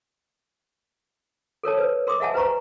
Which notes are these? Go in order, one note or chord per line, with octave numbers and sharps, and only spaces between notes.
A4 A#4 C#5 A5
B4 C5
A#4 C6 D6 D#6
D#5 E5 F#5 G#5 A5
B4 C5 A#5 C#6